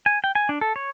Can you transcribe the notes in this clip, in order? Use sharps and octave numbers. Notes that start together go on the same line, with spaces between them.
G#5
G5
G#5
D4
A4
C#5